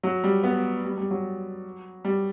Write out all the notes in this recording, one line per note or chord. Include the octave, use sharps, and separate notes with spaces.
F#3
G3
B3
G3
G3
F#3
G3